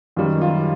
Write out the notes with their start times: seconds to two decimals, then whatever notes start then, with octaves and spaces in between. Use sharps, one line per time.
0.16 F#2 D#3 G3 F4
0.41 F4